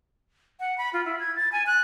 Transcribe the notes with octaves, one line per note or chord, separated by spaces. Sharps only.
F#5
B5
F4
E4
G#6
A6
G#5
F#6